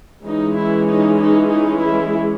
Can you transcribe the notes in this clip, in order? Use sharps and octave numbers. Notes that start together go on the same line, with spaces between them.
E3 G#3 C#4 D#4
E4
D#4
D#4
D#4
E4